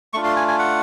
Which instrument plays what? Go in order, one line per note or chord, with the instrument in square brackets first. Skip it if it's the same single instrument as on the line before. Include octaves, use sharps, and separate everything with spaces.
[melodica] A3 D4 F4 C#6
C6
G#5
G#5
F#5